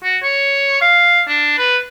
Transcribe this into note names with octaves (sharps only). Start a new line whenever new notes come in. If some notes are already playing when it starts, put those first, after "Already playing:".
F#4
C#5
F5
D4
B4